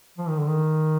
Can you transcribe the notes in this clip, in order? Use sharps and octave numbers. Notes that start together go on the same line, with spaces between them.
F3
D#3
D3
D#3